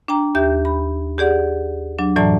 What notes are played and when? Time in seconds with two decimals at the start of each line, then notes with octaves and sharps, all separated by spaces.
0.08 D4 G5 A#5
0.35 D#2 G4 E5 G6
0.65 B5
1.18 G4 G#4 D5 F#5
1.99 F#3 D4
2.16 F#2 A2 E3 F#3 D5 A5